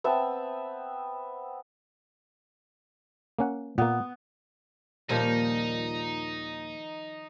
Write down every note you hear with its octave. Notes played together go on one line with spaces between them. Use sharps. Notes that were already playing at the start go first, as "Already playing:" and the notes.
B3 C4 E5 A5
A#3 C#4 F#5
A#2 A#3 B3
D#2 A#2 D#3 F3 G3 C#4 D#4